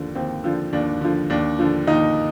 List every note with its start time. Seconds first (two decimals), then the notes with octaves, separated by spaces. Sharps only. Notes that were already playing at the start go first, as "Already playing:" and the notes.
Already playing: D#2 D3 F3
0.15 D#2 C4
0.44 D3 F3
0.73 D#2 D4
1.01 D3 F3
1.30 D#2 D4
1.59 D3 F3
1.87 D#2 D#4